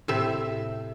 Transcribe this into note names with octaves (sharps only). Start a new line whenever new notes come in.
A2 C3 E5